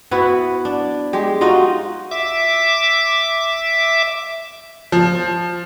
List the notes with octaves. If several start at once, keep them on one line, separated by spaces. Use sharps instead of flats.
B3 E4 F#4 B4
D4
G#3 G4
D#4 F4 F#4 D#5
E5 D6
F3